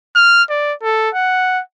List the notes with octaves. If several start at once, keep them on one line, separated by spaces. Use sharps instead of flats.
F6
D5
A4
F#5